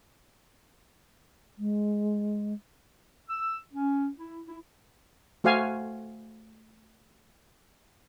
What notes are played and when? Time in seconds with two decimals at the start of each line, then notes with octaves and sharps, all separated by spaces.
1.58 G#3
3.29 E6
3.74 C#4
4.18 E4
4.48 E4
5.44 A3 F#4 C5 F5 G#5